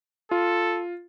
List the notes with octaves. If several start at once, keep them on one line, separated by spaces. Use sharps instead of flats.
F4 A4